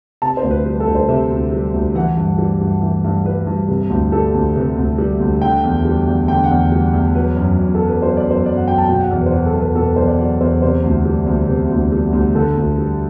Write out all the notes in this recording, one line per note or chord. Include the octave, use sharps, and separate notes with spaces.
C3 A5
C5
D2
B4
G3 B4
A4
D2
C5
C3 E5
D2
G3
D2
E3 F#5
G2
G3
G2
E3
G2
G3 B4
G2
C3
D2
G3 A4
D2
C3
D2
G3
D2
D3 G5
E2
G3
E2
D3 G5
F#5
E2
G3
E2
F#3 B4
F#2
F#2
A4
F#3
B4
F#3 C5
D5
F#2
C5
F#2 D5
F#5
F#3 G5
A5
B2 G5
F#5
E2
B4
C5
F#3 B4
A4
E2
B4
B2 A4
B4
E2 C5
D5
F#3 D5
E2 C5
C3 C5
D2
G3
D2
C3
D2
G3
D2
D3 A4
D2
G3